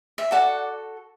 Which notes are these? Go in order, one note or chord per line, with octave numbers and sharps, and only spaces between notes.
E5
F#4 A4 D5 F#5